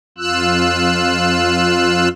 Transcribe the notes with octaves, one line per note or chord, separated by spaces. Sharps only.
F2 F4 E6 F#6